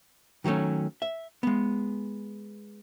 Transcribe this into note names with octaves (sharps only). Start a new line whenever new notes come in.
D#3 F#3 G3 A3 C#4
E5
G#3 B3